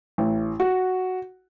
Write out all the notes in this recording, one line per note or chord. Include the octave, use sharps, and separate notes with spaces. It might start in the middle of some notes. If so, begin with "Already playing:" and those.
A1
F#4